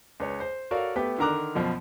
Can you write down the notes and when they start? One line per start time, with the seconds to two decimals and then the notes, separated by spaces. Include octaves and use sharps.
0.20 C#2 B4 C#5
0.40 C5
0.71 F#4 A4 A#4 C#5 D5 F5
0.96 A3 B3 G4 B4
1.18 D3 D#3 A#4 A#5 D6 F#6
1.55 F#2 B2 F3